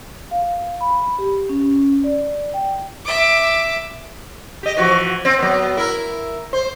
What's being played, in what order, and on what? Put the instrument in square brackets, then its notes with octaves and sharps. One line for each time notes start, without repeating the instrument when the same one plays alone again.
[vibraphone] F5
B5
G4
C#4
D5
G5
[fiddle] E5 D6
[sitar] G4 D#5
E3 F3 F#4
C4
F#3 B3
E4 A#4
C5